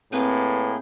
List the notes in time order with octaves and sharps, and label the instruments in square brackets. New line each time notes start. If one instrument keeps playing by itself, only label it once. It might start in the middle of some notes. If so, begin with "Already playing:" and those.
[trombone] A2 [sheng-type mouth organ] A#3 G#4 G6 [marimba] C4 [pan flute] B4